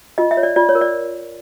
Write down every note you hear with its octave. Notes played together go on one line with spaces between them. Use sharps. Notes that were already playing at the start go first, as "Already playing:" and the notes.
F4 D#5
E5
C#5
D5
F4 D5
C#5
A#4
D5